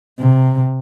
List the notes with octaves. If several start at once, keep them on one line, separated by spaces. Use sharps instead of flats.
C3